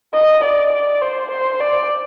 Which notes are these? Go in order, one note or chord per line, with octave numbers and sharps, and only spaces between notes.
D#5
D5
D5
C5
C5
D5